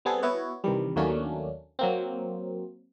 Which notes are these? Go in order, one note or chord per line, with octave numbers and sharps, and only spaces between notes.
G3 B3 C4 G#4 A4
B3 E4 F#4 C#5
C2 C3 D#3 E3 G3
D#2 F#3 A3 A#3 C#4 D4
F#3 A#3 C4